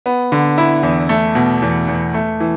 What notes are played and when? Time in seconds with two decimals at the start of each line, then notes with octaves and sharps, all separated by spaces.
0.06 B3
0.32 D3
0.58 E4
0.83 E2
1.09 A3
1.35 B2
1.62 E2
1.88 E2
2.14 A3
2.40 E3